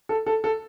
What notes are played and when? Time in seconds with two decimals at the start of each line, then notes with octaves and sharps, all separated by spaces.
0.09 A4
0.26 A4
0.44 A4